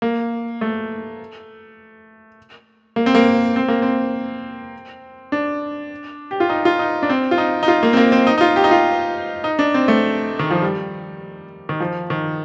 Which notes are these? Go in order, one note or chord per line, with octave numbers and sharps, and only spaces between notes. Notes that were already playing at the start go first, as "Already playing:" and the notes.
A#3
A3
A#3
C4
A#3
C4
A#3
C4
D4
G4
F4
D#4
F4
D#4
D4
C4
F4
D#4
D#4
F4
A#3
C4
A#3
C4
D#4
D#4
F4
G4
D#4
F4
D#4
D4
C4
A3
D#3
F3
G3
D#3
F3
D#3